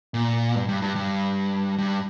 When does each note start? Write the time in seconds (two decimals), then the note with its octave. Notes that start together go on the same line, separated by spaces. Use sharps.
0.14 A#2
0.55 G2
0.69 G2
0.82 G2
0.96 G2
1.78 G2